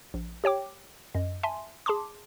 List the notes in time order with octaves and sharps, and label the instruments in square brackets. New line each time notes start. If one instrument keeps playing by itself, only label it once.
[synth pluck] A#1
G4 C#5 G5 D6
F#2 D#5
E5 G#5 A5 C6
G#4 A5 C6 D6